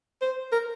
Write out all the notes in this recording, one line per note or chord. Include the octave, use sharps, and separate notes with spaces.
C5
A#4